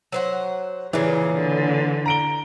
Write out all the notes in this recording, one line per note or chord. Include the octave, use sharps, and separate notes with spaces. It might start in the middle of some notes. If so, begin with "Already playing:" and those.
F#3 C5 F#5
A#2 C#3 E3 G#4
D3
A#5 D7 G7